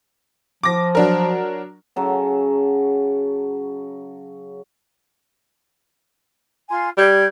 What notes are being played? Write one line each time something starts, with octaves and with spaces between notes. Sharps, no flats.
F3 D6 A#6
F#3 D4 A#4
C#3 F#3 A5
F4 G#5 C6
G3 G4 G6 G#6